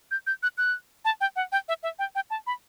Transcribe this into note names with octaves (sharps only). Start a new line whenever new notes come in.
G6
G6
F#6
F#6
A5
G5
F#5
G5
E5
E5
G5
G5
A5
B5